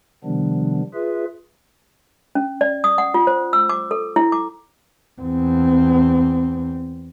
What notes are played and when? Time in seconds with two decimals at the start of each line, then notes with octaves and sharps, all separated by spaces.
0.24 C3 D#3 F3 G3 B3 D4
0.94 F4 G#4 B4 E5
2.35 C#4
2.61 D5
2.84 D#6
2.98 F#5
3.14 F4
3.27 C5
3.53 E6
3.69 D6
3.91 A4
4.16 E4
4.32 D6
5.22 E2 C4